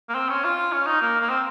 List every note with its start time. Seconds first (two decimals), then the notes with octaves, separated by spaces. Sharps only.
0.09 A#3
0.15 C4
0.29 C#4
0.45 F4
0.73 C#4
0.86 D#4
1.01 A#3
1.20 A#3
1.30 C4